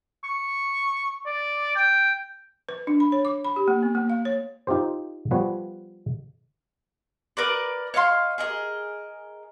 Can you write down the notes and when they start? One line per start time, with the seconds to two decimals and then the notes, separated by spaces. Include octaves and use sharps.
0.24 C#6
1.25 D5
1.76 G5
2.69 B4
2.87 D4
3.00 B5
3.12 C#5
3.25 D6
3.45 B5
3.56 G4
3.68 A#3
3.83 B3
3.95 A#3
4.10 F5
4.25 C#5
4.67 D#4 F4 G4 C5
5.31 F3 G3 B3 B4 C#5
7.37 A#4 B4 D5
7.94 C#5 D#5 F5 C6
8.38 G#4 A#4 D#5